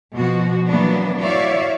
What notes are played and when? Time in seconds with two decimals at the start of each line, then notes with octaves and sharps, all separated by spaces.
0.13 B2 F3 F#4
0.68 E3 F#3 A#3 B3 D4
1.20 E4 F#4 C#5 D5 E5 F5